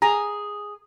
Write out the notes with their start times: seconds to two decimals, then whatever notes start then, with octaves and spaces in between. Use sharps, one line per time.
0.02 G#4 A#5